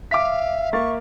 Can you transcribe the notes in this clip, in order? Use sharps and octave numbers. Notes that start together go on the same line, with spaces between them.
E5 F5 D6 B6
A#3 F5 C#6 A6